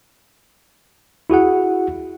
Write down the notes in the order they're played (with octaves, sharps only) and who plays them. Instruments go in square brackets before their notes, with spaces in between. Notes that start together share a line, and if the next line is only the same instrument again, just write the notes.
[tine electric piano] E4 F#4 G#4 F#5